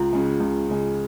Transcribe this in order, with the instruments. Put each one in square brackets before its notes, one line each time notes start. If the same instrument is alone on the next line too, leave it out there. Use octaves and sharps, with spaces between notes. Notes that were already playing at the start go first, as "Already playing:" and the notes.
Already playing: [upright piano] C#2 [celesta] F4
[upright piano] C#3 G#3
C#2
C#3 G#3